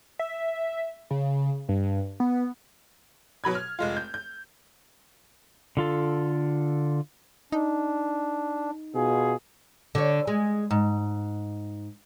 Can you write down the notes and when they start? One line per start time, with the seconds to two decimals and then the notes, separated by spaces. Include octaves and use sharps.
0.19 E5
1.11 C#3
1.69 G2
2.20 B3
3.44 B2 F#3 B5 G#6
3.55 F6
3.79 F1 G#3 F4
3.97 G6
4.14 G6
5.77 D3 F4 A4
7.52 D4 D#4
8.95 B2 F4 G#4
9.95 D3 C#5
10.27 G#3
10.71 G#2